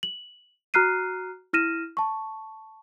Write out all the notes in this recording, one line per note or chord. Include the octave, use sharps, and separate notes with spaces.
F#7
F#4 A#5 F6 F#6 C7 D#7
E4 F6 A#6 D#7 E7
A5 C#6